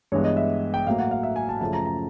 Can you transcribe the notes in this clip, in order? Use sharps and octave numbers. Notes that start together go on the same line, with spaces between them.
G2 E3 G#3 B3 C#5
D#5
E5
G5
A2 F#3 A#3 F5
F#5
F5
E5
G#5
A5
F#2 C#3 F3 A3 A5
A#5
A#5